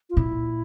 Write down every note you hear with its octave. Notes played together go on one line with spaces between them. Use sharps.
F4
A#2 E4